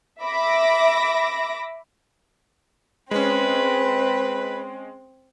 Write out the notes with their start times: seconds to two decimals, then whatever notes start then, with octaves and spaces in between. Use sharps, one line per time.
0.23 E5 B5 D6 A#6
3.11 G#3 C4 C#4 B4